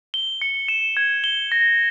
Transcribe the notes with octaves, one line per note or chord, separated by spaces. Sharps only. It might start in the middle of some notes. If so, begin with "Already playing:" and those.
G7
C#7
E7
G#6
G7
A#6